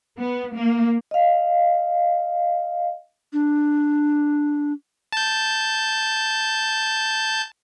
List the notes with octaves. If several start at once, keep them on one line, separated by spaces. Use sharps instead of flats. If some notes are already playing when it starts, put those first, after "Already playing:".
B3
A#3
D#5 F5
D4
A5 G6